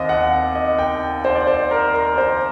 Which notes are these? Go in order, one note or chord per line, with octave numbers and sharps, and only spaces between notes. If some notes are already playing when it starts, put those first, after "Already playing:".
Already playing: D#2 C4 D#5
F#5
D#5
G5
C5
D5
C5
A#4
A#4
C5